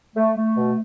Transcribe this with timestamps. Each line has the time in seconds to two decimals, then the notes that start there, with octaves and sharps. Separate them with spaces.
0.16 A3
0.36 A3
0.57 B2